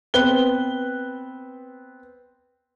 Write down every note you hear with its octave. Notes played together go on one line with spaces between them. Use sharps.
B3 C4 B4 F#6 G7